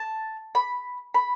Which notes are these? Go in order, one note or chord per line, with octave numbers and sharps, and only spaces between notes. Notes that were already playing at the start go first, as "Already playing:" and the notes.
Already playing: A5
B5
B5